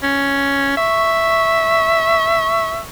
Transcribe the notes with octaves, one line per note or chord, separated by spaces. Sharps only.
C#4
E5 C#6